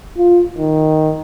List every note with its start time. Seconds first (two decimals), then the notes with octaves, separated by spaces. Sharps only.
0.17 F4
0.58 D#3